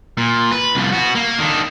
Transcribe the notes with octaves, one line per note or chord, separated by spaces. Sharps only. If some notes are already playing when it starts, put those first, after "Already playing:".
A#2
B4
C2 F3
B3 F#4
A#3
D#3 D4